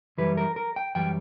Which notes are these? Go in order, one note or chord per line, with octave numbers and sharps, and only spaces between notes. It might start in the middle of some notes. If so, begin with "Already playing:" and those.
F#2 E3 G3 B4
A#4
A#4
G5
F#2 E3 G3 G5